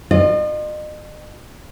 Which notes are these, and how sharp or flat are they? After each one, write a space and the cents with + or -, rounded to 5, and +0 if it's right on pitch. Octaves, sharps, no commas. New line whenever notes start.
F4 +15 D#5 -40